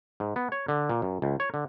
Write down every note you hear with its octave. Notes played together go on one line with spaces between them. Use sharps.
G#2
B3
C#5
D3
A#2
F#2
C#2
C#5
D3